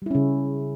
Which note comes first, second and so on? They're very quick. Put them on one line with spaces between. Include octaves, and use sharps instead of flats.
G3 E4 C#4 C#3